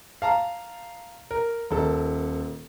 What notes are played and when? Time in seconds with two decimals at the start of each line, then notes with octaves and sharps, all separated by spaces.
0.22 F5 A5 A#5
1.31 A#4
1.71 D#1 A4 A#4